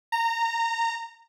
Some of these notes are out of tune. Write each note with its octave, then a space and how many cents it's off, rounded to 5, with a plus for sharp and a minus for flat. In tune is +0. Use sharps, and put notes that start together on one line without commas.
A#5 -20